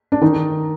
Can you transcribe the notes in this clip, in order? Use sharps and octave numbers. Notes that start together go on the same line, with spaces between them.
D4
D#3 D#4